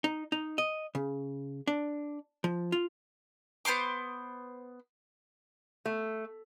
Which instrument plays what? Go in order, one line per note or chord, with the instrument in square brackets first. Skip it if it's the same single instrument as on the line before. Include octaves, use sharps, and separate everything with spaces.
[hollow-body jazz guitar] D#4
D#4
D#5
C#3
D4
F3
F4
[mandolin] B3 C5 C6 D6
[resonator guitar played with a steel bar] A3